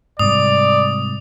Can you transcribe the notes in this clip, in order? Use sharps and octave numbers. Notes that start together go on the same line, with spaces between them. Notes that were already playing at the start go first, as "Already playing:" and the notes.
G#2 C3 G3 D5 D#6